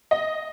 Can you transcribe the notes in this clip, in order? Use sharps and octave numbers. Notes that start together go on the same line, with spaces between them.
D#5